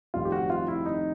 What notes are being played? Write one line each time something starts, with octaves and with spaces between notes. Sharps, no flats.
F1 F2 C3 D#3 G3 F4
G4
F#4
F4
E4
D#4